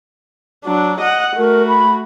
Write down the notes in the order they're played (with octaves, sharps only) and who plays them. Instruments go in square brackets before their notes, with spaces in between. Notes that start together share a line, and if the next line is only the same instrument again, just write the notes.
[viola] F#3 D4
D#5 F#5
[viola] A3 F#4 [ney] A#4
[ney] B5